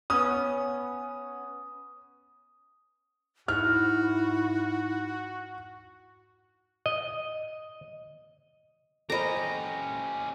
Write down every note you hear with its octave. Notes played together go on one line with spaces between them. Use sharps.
B3 C#4 D#6
G#2 E4 F#4 F6
D#5
C#4 G4 A4 C5 D#5 A#5 B5